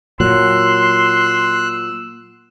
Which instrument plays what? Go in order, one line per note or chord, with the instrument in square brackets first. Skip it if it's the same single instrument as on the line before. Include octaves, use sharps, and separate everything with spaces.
[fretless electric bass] A#2 F#3 [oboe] C6 [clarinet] E6 [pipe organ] F#6